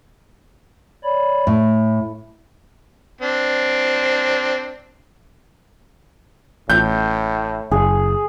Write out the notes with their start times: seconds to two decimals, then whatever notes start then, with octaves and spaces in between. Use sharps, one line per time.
1.04 C#5 D5 B5
1.47 A2 A3
3.21 C4 D4
6.70 A1 A2 G6
7.71 F#1 G#4